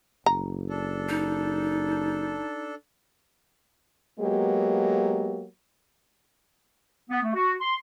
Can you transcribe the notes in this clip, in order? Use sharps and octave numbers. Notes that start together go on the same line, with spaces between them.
F#1 A#5
D4 A4
D#4
F#3 G#3 A#3 B3 G4
B3
A3
F#4
C6